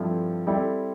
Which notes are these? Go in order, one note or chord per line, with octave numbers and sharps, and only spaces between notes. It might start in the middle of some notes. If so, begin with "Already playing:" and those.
Already playing: G2 F3 C4 E4 A4
G3 C4 E4 A4 D5